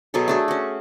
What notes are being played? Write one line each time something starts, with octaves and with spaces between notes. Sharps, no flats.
B2 F#3 G#4 A4
A3 D4 G#4
C#4 F#4